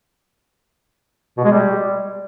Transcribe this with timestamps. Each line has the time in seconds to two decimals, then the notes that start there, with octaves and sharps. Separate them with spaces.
1.38 B2
1.45 G#3
1.52 G3